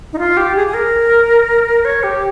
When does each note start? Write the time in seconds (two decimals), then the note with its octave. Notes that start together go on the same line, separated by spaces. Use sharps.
0.13 D#4
0.19 F4
0.37 G4
0.56 G#4
0.67 G#4
0.74 A#4
1.85 C#5
2.03 G4